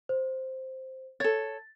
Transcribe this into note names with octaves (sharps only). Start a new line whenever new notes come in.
C5
A4 C#5 A6